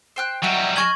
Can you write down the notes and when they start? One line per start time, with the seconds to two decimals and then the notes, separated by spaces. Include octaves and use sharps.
0.16 C5 G5 F#6
0.43 F#3 G3 D#5 E5 F#5
0.76 D#5 G#5 C#6 F6 G#6 F#7